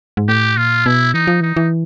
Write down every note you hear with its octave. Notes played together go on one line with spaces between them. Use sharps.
G#2
A2 G4
A#2 F4
B2 E4
E3 D#4
F3
E3 D#4
E3